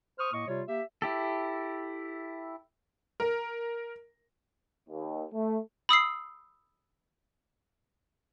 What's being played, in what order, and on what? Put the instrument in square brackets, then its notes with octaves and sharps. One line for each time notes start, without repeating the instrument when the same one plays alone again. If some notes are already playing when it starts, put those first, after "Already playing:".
[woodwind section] C5 C#6 D#6 F6
A2 A#3 D#5 C#6
C3 G3 F4 C#5
A#3 G4 E5
[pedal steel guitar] E4 G4 A4
[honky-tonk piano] A#4
[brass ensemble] D#2
A3
[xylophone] B5 D#6 E6 C7